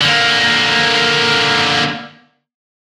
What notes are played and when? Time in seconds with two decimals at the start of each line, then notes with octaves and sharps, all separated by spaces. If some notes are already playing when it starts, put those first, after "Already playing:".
0.01 D3 A#3